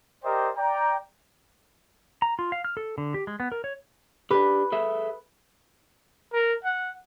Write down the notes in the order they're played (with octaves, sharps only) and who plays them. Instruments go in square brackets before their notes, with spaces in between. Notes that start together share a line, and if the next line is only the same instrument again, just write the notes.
[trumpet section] G4 A#4 C5 D5 D#5 G5
D5 G5 A#5
[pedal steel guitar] A#5
F4
F5
F6
A4
D3
G4
G#3
B3
A#4
C#5
[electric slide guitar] D4 G4 [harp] B4
[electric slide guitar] G#4 A4 E5
[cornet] A#4
F#5